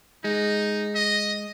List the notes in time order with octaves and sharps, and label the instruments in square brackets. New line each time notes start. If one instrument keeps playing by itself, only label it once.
[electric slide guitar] G#3 [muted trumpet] D#4
[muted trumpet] D#5